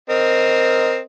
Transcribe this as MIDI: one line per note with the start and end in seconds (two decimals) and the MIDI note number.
0.10 1.00 60
0.10 1.00 70
0.10 1.00 75